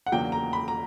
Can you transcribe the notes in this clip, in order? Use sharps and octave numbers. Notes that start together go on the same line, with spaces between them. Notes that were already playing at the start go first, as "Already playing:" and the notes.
F#5
E2 C#3 F#3 A#3 D4 G5
A#5
B5
A#5